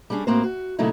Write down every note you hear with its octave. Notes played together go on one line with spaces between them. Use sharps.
G3 C#4 D4 G#4
A2 A#3 C4 F#4 C5
F#4
A#2 C#3 F#3 A3 D#4 E4